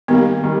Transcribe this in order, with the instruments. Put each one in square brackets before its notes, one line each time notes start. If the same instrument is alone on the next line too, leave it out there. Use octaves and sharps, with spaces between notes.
[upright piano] D#3 G3 A#3 [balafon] B3
[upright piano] D#3 G3